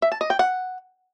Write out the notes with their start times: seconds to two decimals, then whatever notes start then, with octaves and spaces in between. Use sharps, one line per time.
0.02 E5
0.12 A5
0.21 D#5
0.30 G5
0.39 F#5